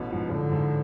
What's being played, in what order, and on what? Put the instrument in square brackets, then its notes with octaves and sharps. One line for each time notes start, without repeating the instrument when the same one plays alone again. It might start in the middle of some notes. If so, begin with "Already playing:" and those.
Already playing: [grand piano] A1 [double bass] B2
[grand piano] G#2 F3
[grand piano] A1 [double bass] D3
[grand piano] G#2 F3